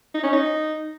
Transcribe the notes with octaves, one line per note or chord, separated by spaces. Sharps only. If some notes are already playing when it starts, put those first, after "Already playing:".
D#4
C#4
D#4